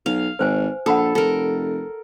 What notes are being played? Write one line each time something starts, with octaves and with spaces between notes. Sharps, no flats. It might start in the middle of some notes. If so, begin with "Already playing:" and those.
B1 F5
G#1 B4 C5 G#5
A#1 A4 F#5 B5 D#6
F1 A4 A#4